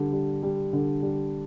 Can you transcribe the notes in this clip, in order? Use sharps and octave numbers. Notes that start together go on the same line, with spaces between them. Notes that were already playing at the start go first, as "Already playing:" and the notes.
Already playing: D3 G3
G3
G3
D3
G3